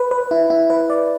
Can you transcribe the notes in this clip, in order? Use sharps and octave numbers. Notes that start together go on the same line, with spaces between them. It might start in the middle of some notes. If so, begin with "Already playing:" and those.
Already playing: B4
B4
E4
E4
B4
D5